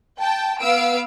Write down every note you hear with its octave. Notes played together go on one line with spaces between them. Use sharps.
G5 A5
B3 F5 E6 D7